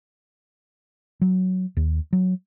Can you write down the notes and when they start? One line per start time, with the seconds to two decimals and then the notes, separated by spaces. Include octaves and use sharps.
1.21 F#3
1.77 D#2
2.13 F#3